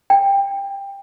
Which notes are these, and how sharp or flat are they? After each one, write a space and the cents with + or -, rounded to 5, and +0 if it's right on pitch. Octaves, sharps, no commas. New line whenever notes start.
G5 +15